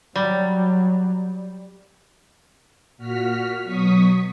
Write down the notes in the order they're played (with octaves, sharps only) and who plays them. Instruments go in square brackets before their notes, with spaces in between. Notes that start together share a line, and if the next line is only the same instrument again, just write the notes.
[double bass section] F#3 [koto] G3
[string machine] A#2 F#4 F6 B6
B2 F#3 C#6 D#6 B6